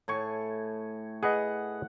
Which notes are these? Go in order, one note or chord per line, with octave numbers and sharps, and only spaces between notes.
A2 G#5 C#6
G#4 B4 D#5 F#5